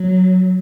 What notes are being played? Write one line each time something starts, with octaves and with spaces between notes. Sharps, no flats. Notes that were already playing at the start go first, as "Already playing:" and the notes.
Already playing: F#3